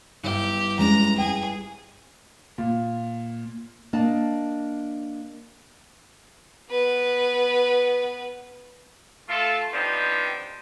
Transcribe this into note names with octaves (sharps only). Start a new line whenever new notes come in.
G1 E4 G4
G#3 C#4 D4 A#5
G#4 G5
A#2
A#3 D4 D#5 A5
B3 B4
A3 F4 A4
F3 B3 C4 D4 D#4 G4